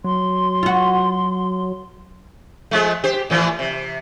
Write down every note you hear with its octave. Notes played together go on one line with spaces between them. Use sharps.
F#3 C6
F4 F#4
F3 G#3 A3
G4 C5
A2 E3 F3
C3